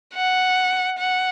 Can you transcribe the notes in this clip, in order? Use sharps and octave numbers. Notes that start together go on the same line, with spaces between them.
F#5
F#5